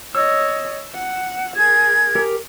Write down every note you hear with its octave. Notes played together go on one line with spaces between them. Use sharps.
C#5 D#5 E6
F#5
G#4 A#4 G#6
G4 A#4